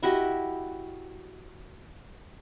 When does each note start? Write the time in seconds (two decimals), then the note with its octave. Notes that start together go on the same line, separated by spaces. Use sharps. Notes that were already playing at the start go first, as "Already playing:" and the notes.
0.03 E4 F#4 G4 D#5